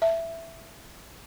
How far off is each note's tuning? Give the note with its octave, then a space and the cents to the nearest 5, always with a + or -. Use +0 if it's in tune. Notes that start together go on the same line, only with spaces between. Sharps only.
E5 +10